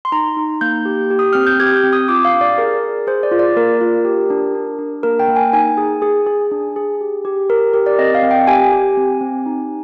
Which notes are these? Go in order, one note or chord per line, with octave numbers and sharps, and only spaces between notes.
C6
D#4 A#5
D#4
A#3 G6
G4
G4
D#6
C4 F6
G6
G4 G#6
G6
C4
D#6
F4 D6
F5
D4
D5
G#4 A#4
G#4
G#4 C5
D5
F4
D5
A#3 A#4
F4
G4
D4
D4
D4
A#3 A#4
G5
A#3
G#5
D#4 G#5
G#4
G#4
G#4
D4
G#4
G4
G4
G4 A#4
G4 A#4
D5
C4 D#5
F5
C4
G5
G4 G#5
G4
C4
C4
D#4